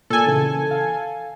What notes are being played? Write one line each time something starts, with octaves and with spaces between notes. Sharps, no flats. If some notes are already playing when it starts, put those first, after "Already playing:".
A#2 A4 G#5 E6
C#3 E3
F5